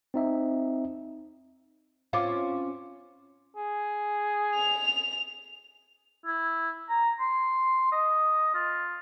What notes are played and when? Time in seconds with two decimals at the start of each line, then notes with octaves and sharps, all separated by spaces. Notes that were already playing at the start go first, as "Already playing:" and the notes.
0.14 C4 D#4 E5
2.13 C4 C#4 F4 F5 D6
3.56 G#4
4.56 F7
6.26 E4
6.89 A#5
7.20 C6
7.92 D#5
8.55 F4